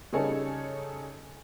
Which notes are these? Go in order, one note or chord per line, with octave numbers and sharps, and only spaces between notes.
C#3 G3 D#4 G#4 A4 C#5